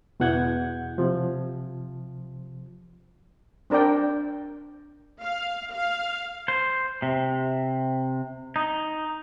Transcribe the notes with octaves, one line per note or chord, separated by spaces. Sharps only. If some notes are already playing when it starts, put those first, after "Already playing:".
E2 B2 E3 F#5 G6 G#6
C3 F3
C4 D4 A#4 D5 G5
F5
F5
C5
C3
D#4